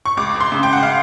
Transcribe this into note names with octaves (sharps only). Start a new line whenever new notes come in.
C#6
C#2 D6
C6
C#3
G5
F#5
F5